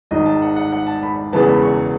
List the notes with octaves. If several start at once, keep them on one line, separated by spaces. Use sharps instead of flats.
G#1 G#2 D#3 D#5
A5
F#5
F#5
F#5
A5
B5
E1 E2 C#3 E3 B3 A5
B5
C#6